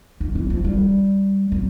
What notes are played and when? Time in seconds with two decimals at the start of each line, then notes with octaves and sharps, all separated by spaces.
0.20 D#3
0.35 E3
0.50 F3
0.65 G3
1.52 F#3